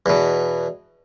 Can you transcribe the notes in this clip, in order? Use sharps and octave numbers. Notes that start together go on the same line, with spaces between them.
E2 B2